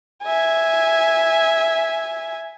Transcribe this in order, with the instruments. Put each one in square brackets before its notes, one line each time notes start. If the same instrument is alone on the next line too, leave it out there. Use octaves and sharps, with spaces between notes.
[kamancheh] E5 G#5